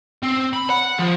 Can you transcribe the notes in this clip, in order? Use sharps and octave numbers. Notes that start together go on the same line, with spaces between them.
C4
B5
F#5
F3